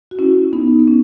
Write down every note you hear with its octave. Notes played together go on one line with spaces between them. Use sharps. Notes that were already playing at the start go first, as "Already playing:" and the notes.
F#4
C#4 E4
B3 D#4
B3
C#4